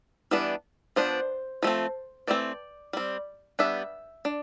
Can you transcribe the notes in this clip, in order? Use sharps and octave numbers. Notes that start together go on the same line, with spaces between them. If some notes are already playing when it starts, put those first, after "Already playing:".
E3 G3 B3 D4
F3 B3 D4 C5
F3 A3 C4
E3 A3 C4 D5
G3 C4
G3 B3 D4 E5
D4